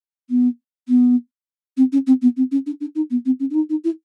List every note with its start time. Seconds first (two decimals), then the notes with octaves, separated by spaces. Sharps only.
0.29 B3
0.88 B3
1.77 C4
1.92 C#4
2.06 C4
2.21 B3
2.36 C4
2.51 C#4
2.66 D4
2.80 D4
2.95 D#4
3.10 B3
3.25 C4
3.39 C#4
3.50 D4
3.54 D#4
3.69 D#4
3.84 E4